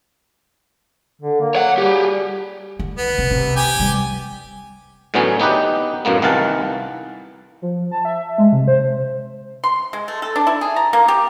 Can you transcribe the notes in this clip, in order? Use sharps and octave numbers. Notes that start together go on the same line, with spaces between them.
D3
A#3
C#5 F#5
G3 G4 G#4
D3
B3
C3
C3
G4 G5 G#5
G3
A2 D3 E3 F#3 B3 C#4
B3 D#4 G4 B4
F#2 A2 A#3 B3
C2 D#3 E3 F5 F#5 A5
F3
A5
E5
G#3
C3
C5
C6
G#3
A3
A4
D4
E4
G#4
A#5
A#3
G4